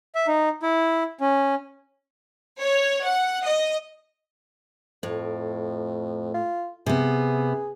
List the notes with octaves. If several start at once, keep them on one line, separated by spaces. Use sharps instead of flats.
E5
D#4
E4
C#4
C#5
F#5
D#5
F2 A2
F4
C3 B3 G#4